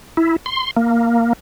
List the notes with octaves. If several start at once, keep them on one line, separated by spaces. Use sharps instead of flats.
E4
C6
A#3